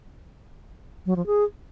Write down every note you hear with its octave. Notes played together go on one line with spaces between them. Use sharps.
F#3
F3
G#4